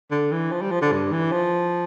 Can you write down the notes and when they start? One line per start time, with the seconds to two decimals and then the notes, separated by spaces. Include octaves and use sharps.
0.11 D3
0.32 E3
0.52 F3
0.61 G3
0.71 F3
0.82 D3
0.92 G2
1.12 E3
1.32 F3